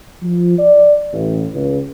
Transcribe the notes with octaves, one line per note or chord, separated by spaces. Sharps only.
F3
D5
A1
C#2